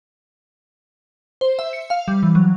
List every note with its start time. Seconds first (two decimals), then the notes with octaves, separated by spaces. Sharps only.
1.41 C5
1.59 E5
1.73 C#7
1.90 F5
2.08 G3
2.23 E3
2.35 F#3